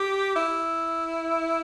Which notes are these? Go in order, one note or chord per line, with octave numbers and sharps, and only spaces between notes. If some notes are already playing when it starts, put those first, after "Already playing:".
Already playing: G4
E4